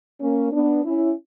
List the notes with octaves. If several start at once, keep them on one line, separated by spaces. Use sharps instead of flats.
A#3 C#4
B3 D4
C#4 E4